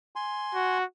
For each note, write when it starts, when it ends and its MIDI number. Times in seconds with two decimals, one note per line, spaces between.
0.16 0.78 80
0.16 0.78 84
0.55 0.84 66